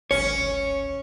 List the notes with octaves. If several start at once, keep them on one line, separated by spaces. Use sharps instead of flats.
D1 G#1 C#4 C#5